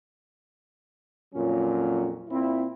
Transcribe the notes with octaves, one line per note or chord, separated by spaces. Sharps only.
F2 A#2 F#3 C#4
A#2 C4 E4